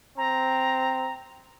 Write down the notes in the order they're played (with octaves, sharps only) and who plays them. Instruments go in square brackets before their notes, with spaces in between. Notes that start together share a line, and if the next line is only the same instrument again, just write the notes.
[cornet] C4 [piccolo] A#5